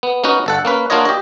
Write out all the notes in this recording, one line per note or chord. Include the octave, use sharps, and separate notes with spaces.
B3
B3 C#4 D#4 F#4
G1 A4 F#5
A#3 C#4 B4
A#3 D4 F4 F#4 C#5 D#5
G4 D#5